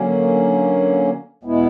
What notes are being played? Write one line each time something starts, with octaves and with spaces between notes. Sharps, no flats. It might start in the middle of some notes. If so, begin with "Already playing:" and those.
Already playing: D3 F#3 A#3 C#4
E2 B2 G#3 B3 E4